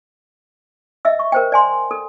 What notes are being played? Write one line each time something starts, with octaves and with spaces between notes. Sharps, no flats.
D#5 E5 E6
C#6
A#4 C5 G5
D5 G#5 C6
A4